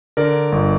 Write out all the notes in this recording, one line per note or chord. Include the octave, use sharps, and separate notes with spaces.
D3 A#4 D5
G1